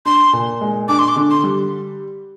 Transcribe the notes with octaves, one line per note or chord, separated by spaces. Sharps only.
D4 C6
A#2
G#3
D4 D6
C6
D6
D3
C6
G3